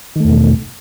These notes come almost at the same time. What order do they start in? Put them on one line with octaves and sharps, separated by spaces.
D#3 A3 E2 B2